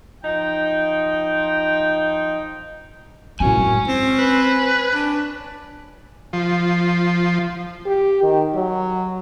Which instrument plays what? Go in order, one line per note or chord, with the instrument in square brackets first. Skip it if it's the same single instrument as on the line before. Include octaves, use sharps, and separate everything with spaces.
[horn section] F3 D#4 G5
[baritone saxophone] F#2 [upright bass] A2 C4 [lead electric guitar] C#5 G#5
[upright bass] G#3
[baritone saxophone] C4
[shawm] B4
[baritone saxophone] D4
[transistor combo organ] F3
[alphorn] G4
D#3
F#3